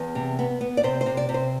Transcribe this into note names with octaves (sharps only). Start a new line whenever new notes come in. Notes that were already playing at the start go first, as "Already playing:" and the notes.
Already playing: E2
C3
B3
B3
D5
C3 C5
C5
C3
D5
C3
C5